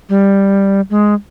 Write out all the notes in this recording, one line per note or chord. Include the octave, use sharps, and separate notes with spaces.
G3
G#3